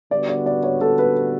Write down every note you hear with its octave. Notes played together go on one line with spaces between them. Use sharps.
D3 G3 B3 F#4 D5
D5
D5
C#5
A4
B4